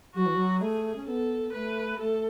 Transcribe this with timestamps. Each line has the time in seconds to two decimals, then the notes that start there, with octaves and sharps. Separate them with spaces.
0.15 F#3 F#4
0.26 E3
0.35 F#3
0.61 A3 G#4
0.96 C#4
1.07 B3 A4
1.53 A3 B4
1.99 A3 A4